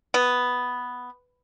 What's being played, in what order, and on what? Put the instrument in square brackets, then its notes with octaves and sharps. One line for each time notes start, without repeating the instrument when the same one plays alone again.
[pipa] B3